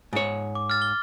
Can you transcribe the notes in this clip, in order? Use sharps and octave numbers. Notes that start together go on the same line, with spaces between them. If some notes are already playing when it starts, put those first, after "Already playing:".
G#2 C#5
D6
F6 A6
G7